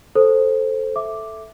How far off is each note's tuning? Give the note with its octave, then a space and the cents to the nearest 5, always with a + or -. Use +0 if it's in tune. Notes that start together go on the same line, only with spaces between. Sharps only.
A4 +0 C5 +5
A4 -5 E5 +0 D6 +0